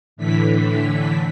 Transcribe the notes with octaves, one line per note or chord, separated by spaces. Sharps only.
A2 D3 E3 B6